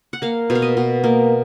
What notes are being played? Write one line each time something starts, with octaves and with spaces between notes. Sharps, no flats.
F#5
A#3 F5
B2
F5
D#5
B2
A#3